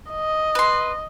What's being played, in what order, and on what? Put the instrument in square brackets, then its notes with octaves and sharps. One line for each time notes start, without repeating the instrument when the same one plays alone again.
[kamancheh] D#5
[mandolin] B4 C6